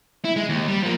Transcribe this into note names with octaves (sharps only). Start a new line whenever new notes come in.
E4
G#3
D#2
G3
F3 A#3